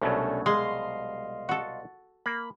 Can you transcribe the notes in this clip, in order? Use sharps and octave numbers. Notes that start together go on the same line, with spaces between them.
C2 B2 F#3 A3 C#4 D4
G#3 D#5 F5 C6
F#4 A4
A#3 B5